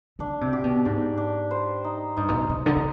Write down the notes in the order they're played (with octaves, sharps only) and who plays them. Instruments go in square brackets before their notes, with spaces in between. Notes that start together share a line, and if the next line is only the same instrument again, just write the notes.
[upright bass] D3 [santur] D4
[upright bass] C3
[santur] G4
[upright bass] B2
[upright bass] G#2 [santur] D4
[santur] D4
C5
D#4
[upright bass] G2 [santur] D#4
[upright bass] G#2
B2
[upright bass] B2 [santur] D#4
[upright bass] D3
D3